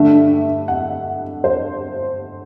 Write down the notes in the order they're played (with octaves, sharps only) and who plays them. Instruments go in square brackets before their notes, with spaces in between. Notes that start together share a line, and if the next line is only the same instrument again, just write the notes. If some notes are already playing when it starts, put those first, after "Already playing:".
Already playing: [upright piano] G2 D3 A3 D4 E5
F#5
C5